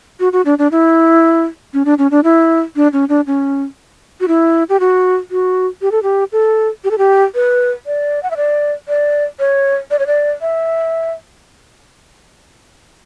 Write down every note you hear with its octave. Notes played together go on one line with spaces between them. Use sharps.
F#4
F#4
D4
D4
E4
C#4
D4
C#4
D4
E4
D4
C#4
D4
C#4
F#4
E4
G4
F#4
F#4
G4
A4
G4
A4
G4
A4
G4
B4
D5
F#5
E5
D5
D5
C#5
D5
C#5
D5
E5